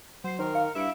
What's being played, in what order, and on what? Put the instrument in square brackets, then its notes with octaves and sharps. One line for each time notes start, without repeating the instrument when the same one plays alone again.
[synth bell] F#3 C7 [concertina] C5
[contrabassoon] D#3 [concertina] A#4 [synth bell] C5
[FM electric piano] F5 [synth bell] C#7
[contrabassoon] G2 [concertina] E4 E5 [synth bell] C#7 D7 E7